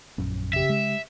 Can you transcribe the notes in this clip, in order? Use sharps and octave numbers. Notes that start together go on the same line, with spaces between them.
A#1 F#2 C#4
C#3 G4 E5
G#3